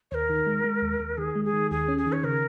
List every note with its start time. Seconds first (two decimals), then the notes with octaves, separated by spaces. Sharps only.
0.11 D#2 A#4 C#5
0.29 D#3
0.47 G#3
0.64 G#3
0.82 D#2
1.00 D#2
1.17 D#3 G#4
1.35 G#3
1.44 G#4
1.53 D#3
1.71 D#2 G#4
1.88 C#4
1.98 G#4
2.06 D#3
2.12 C#5
2.23 C#3 A#4